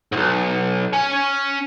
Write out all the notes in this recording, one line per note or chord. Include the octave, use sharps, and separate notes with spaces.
B1 G#2
C#4 G#5